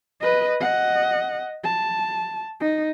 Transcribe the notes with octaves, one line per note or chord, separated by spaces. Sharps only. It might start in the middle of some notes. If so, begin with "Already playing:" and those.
B4 D#5
D#5 F#5
A5
D#4